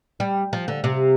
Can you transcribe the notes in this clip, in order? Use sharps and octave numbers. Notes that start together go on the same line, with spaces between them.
G3
F3
D3
C3